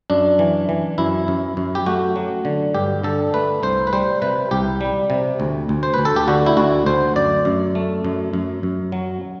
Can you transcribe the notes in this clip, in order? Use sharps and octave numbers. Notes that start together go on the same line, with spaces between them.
F#2 D4
E3
E3
F#2 E4
F#2
F#2
G4
A3 F#4
F#3
D3
G2 G4
D3 A4
A3 B4
C2 C5
B4
G3 C5
C3 B4
C2 G4
G3
C3
D2
D2
C5
D2 B4
A4
G4
D3 F#4
E4
D2 F#4
D2 C5
F#2 D5
F#2
A3
F#2
F#2
F#2
F#3